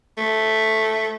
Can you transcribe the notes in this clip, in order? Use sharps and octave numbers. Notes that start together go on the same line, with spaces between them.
A3